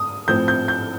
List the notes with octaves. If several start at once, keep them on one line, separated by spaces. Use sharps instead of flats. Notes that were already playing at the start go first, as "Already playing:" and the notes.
Already playing: D#6
A2 F3 C4 G6
G6
G6